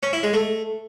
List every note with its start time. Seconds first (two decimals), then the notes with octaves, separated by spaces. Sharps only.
0.03 C#4
0.13 E4
0.23 G#3
0.33 A3